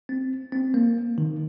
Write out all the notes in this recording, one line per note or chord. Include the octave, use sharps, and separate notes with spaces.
C4
C4
A#3
D#3